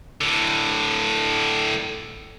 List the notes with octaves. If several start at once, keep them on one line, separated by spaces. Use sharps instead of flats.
A2 D3